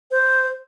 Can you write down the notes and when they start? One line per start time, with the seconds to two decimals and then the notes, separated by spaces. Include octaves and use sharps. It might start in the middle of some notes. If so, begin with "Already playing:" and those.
0.11 C5